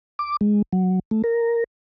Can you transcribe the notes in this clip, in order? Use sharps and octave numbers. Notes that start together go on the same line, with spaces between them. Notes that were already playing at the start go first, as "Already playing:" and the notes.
D6
G#3
F#3
A3
A#4